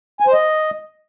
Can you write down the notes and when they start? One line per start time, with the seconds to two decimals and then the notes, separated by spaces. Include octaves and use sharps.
0.20 G#5
0.27 C5
0.33 D#5